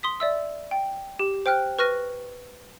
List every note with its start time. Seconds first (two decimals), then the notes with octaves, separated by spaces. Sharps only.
0.03 C6 D#6 B6
0.20 D5 E5 E6
0.71 G5
1.19 G4
1.46 C5 G5 F6 F#6
1.79 B4 C#6 F6 F#6 A#6 D#7